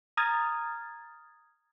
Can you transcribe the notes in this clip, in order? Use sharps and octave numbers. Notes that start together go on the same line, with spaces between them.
A#5 D#6 F6 G#6 A6